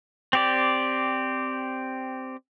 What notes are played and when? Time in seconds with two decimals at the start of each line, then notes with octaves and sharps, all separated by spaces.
0.33 C4 G4 D5